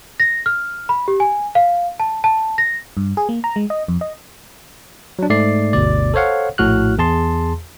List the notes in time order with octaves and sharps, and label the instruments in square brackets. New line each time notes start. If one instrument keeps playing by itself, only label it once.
[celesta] A#6
F6
B5
G4
G#5
F5
A5
A5
A#6
[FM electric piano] G2
G#4
A#3
A#5
G#3
D#5
F2
D#5
[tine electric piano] F#3 D4
G#2 A3 D5 C7
G1 D2 B2 D5
A4 C5 C#5 F5 F#5
A#1 A2 F#4 F6 F#6
E2 G#4 A5 C6